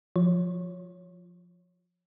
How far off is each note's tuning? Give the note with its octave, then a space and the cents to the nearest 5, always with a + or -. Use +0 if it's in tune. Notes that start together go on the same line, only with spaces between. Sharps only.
F3 +10 C#5 +0